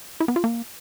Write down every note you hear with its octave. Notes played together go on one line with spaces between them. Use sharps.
E4
B3
F4
A#3